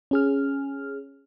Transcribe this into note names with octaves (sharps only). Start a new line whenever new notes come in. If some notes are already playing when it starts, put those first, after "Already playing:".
C#4 G#4 F6